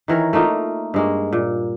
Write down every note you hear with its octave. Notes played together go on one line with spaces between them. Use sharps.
D#3 E3 A#4 C#5
A3 A#3 D#4 F4
G2 G#3 A#3
A#2